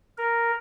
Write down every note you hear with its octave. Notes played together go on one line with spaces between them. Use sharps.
A#4